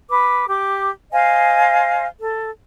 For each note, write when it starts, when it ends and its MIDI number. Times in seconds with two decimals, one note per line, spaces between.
0.08 0.45 71
0.08 0.45 86
0.48 0.90 67
0.48 0.90 86
1.12 2.05 72
1.12 2.05 75
1.12 2.05 77
1.12 2.05 80
2.20 2.48 69